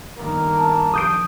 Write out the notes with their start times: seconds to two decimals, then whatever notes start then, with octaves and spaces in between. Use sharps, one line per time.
0.18 G1 D#3 A#3
0.56 A5
0.94 A#1 D#6 G6 D7